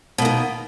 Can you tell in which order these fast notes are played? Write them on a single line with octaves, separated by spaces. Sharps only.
B2 A#3 D#3